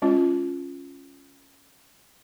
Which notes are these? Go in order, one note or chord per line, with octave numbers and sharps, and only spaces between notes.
G#3 C#4 F4